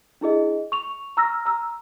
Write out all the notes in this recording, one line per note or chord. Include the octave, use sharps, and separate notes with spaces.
D4 E4 G#4 D#5
C#6 F7
A#5 E6 F6 A#6
A#5 E6